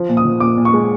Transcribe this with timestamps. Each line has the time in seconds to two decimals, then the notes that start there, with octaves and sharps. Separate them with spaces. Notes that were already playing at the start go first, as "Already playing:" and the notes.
Already playing: F3
0.09 A#2
0.17 D#6
0.25 F3
0.40 A#2 D6
0.57 A#2
0.65 C#6
0.73 G#3